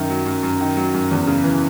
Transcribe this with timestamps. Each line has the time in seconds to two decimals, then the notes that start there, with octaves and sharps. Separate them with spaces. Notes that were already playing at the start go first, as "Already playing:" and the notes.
Already playing: F#2 D#3 E5
0.10 F#3
0.26 F#2
0.43 F#2
0.61 D#3
0.77 F#3
0.94 F#2
1.11 E2
1.27 C#3
1.44 E3